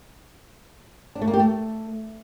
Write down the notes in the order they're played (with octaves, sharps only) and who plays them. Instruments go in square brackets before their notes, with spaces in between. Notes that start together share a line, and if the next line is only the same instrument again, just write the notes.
[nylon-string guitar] D4
A3
A#3
G4
A3